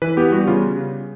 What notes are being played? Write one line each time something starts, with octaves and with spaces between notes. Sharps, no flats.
E3 B4
B3 G4
G3 F#4
C#3 F4